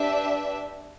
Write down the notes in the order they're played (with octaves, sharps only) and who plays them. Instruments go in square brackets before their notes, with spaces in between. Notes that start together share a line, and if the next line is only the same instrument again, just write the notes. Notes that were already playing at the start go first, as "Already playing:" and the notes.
Already playing: [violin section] D4 G4 B4 E5